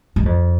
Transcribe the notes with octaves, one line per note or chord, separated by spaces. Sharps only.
G2
F2